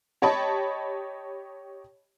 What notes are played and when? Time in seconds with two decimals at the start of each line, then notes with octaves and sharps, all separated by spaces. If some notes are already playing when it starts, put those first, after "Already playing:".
0.22 G4 C#5 D#5 A5 B5